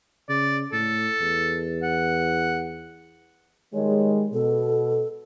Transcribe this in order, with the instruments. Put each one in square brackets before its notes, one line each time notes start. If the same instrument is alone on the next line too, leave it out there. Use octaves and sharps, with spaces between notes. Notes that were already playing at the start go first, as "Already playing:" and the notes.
[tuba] C#3 [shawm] D5
[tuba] A2 [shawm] A4
[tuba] E2
[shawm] F#5
[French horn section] D#3 G3 G#3 [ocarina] C#5
[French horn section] B2 [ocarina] A4